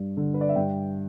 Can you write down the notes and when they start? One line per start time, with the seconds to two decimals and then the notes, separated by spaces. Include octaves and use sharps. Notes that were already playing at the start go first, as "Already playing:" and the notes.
Already playing: G2
0.17 D3
0.34 B4
0.41 D5
0.49 E5
0.56 G2 G5